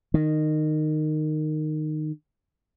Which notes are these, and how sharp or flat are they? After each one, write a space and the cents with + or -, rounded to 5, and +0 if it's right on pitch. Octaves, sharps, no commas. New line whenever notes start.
D#3 -15